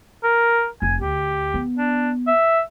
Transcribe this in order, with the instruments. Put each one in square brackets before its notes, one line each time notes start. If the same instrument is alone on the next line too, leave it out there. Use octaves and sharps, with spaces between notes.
[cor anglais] A#4
[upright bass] F1 [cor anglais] G#5
[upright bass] D2 [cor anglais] G4
[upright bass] B3
[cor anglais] D4
E5